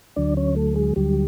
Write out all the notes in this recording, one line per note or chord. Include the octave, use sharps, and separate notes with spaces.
D2 D3 F#3 D4 D5
C#4 C#5
A3 A4
G#3 G#4
D2 D3 F#3 G3 G4